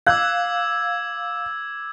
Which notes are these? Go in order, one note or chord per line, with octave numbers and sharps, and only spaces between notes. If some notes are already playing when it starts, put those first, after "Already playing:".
F5 D6 E6 F#6 G#6